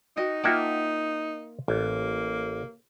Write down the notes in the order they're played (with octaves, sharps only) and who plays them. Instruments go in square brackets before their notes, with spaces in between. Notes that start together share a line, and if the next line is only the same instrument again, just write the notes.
[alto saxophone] D#4 [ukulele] F#4 D#5 G5
[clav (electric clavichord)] A#3 F#5 A5 [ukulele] F4 E5 G5
[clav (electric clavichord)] A1 [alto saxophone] A#3